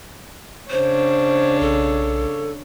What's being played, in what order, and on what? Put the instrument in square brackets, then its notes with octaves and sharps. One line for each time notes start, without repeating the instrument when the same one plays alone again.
[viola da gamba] C#3 D4 C#5 [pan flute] C5
[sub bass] B1 [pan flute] A4